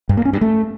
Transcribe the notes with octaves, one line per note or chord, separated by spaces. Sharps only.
G2
A#3
C#4
G2
A3